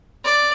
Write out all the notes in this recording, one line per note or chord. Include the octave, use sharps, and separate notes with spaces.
D5